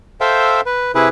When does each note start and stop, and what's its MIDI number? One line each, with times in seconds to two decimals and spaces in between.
0.21 0.61 69
0.21 0.61 72
0.21 0.61 76
0.21 0.61 77
0.21 0.61 79
0.66 0.92 71
0.95 1.09 48
0.95 1.09 64
0.95 1.09 68
0.95 1.09 71